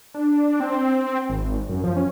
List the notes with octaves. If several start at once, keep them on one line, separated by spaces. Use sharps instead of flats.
D4
C4
G#1
F#2
F3
C#4